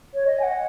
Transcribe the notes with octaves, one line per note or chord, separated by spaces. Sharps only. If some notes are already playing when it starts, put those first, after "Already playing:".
C#5
D#5
G#5
F#5